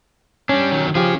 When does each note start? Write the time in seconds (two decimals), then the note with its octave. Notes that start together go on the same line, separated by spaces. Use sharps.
0.49 G3 C#4 D4
0.72 D#3 F#3
0.95 F3 C#4 G4 G#4